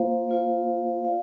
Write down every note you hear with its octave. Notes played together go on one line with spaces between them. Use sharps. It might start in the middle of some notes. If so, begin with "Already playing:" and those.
Already playing: A#3 F4 C5 F5
A#3 F4 C5 F5
F4 D5 F5